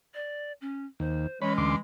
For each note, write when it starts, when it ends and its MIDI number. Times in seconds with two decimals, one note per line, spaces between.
0.14 0.52 74
0.61 0.85 61
1.00 1.27 39
1.00 1.41 72
1.42 1.78 52
1.42 1.78 56
1.42 1.73 61
1.42 1.53 73
1.42 1.53 83
1.58 1.76 38
1.58 1.76 84
1.58 1.76 86